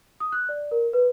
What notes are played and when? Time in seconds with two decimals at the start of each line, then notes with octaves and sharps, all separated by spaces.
0.20 D#6
0.32 F#6
0.49 D5
0.71 A#4
0.93 B4